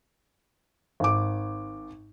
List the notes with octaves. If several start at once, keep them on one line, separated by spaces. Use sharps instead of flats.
G#1 D6